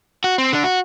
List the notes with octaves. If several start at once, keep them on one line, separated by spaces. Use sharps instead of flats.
F#4
C4
D3 D4
F#4